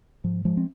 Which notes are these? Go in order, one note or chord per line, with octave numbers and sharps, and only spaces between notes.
G#2 F3
F3 G#3
C4